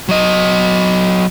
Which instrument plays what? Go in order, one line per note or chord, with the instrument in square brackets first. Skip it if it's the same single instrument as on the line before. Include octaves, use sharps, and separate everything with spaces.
[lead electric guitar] F#3 D#5